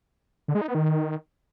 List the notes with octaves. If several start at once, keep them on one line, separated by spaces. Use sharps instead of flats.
D3
G#3
D#4
B3
D#3